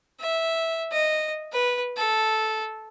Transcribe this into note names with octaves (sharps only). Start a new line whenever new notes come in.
E5
D#5
B4
A4